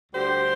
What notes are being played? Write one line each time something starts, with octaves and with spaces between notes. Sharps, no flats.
D2 D3 G3 G4 C5